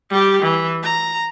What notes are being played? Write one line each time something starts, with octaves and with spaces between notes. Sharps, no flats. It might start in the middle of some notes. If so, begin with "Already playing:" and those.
G3 G4
E3
A#5